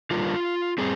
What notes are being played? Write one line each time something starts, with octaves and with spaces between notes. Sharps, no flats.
D3 G3 A#3 F4
G3 C4 G#4